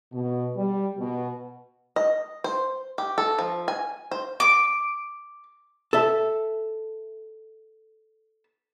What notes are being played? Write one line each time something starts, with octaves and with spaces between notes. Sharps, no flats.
B2
G3
B2
D#5
C5
G4
A4
F3
G#5
C5
D6
A4 E5